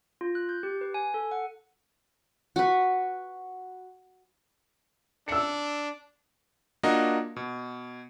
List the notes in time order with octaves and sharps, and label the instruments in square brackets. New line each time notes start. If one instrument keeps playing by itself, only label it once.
[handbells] F4
F#6
G6
G4
B4
G#5
A4
F#5
[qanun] F#4 B4
[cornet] D4 [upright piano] E6 C#7
[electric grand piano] A#3 D4 F4 F#4 A#4 D#5
B2